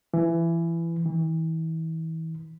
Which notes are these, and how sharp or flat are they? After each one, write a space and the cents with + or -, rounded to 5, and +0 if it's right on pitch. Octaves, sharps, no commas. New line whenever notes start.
E3 +20
E3 -35